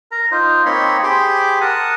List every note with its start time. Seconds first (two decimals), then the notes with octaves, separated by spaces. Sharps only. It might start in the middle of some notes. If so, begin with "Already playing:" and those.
0.11 A#4 A#5
0.32 D#4 F4 C5
0.66 A#3 C4 D#4 C#5 B5 C6
1.03 G4 G#4 C5 B5 C6 D6
1.61 A#4 F#5 A5 D#6